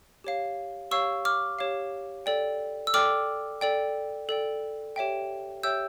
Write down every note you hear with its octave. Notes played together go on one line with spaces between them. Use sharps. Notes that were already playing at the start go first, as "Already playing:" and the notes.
G4 C#5 F5
G4 C#5 F5 C#6 E6
D6 F6
G4 C#5 F5
A4 D5 G5
E6
A4 D5 G5 D6 F6
A4 D5 G5
A4 D5 G5
G4 C#5 E5 G5
G4 C#5 E5 G5 E6 G6